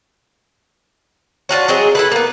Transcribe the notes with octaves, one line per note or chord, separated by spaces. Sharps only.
D4 F4 F#4 C#5
F#3 G#3 C4 G#4
E4 A4 B4
A#3 B3